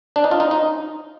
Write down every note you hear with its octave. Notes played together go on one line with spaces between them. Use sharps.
D4
D#4
F4
D#4
D#4